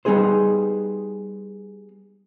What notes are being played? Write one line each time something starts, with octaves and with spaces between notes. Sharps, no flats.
G3 B3 D#4 G#4 C5